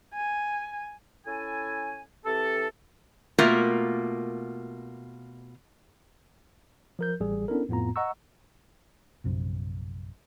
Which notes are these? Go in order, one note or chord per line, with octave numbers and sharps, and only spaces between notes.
G#5
C#4 E4 A4 G#5
E3 C4 G4 A4
B2 A3 A#3 F4 A#4
F3 A#4 G6
A1 G3 G#4
B3 C#4 D4 E4 A4 A#4
F2 A2 B3 F4 A#5
D#5 F#5 A#5 C#6 E6
A#1 F#2 C3